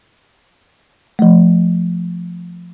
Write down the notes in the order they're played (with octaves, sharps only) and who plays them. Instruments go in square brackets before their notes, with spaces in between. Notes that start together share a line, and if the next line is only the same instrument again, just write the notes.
[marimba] F3 A3